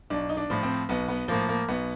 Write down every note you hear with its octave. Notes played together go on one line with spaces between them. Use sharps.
B1 D4
D#4
D4
A2 F3
C4
B1 B3
B3
A2 F3 A#3
A#3
B1 B3